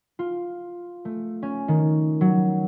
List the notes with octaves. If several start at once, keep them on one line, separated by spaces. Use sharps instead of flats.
F4
A3
C#4
D#3
F#3